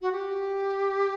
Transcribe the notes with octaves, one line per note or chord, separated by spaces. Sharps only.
F#4
G4